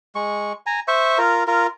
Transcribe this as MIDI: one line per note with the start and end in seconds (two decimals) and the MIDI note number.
0.15 0.53 56
0.15 0.53 85
0.66 0.80 80
0.66 0.80 82
0.88 1.18 72
0.88 1.18 76
0.88 1.18 85
1.18 1.44 65
1.18 1.44 70
1.47 1.67 65
1.47 1.67 70